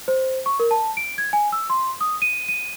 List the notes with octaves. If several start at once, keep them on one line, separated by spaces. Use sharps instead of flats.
C5
C#6
A#4
A5
D7
G#6
G#5
E6
C6
D#6
D#7
D#7